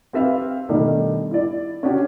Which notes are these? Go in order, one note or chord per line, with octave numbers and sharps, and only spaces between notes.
C4 G4 B4 E5 F5
B2 D#3 G3 A3 D4 D#4
E4 D5
C#4 D4 F#4 G4